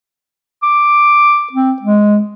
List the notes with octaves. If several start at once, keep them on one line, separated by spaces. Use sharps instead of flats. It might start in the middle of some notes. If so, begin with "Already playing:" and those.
D6
C4
G#3